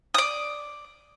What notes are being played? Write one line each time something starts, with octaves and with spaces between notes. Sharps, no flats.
D5 D#6